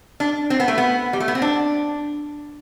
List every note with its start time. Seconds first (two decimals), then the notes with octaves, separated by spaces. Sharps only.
0.20 D4
0.50 C4
0.60 B3
0.68 A3
0.78 B3
1.13 G3
1.20 A3
1.28 B3
1.35 C4
1.42 D4